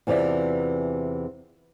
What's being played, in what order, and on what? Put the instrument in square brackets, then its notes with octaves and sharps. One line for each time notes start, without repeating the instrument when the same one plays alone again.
[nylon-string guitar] E2 C3 E3 F4 D5 E5